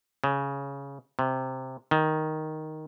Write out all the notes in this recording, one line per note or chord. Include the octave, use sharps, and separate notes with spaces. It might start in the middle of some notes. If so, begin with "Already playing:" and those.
C#3
C3
D#3